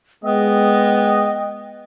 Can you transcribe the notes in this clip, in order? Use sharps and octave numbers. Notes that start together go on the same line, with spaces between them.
G#3 B3 D#5 G5